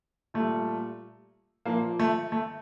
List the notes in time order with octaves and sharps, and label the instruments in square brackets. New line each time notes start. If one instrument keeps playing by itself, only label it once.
[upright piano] A#2 G3 A3
A#2 F3 A#3
A3
A3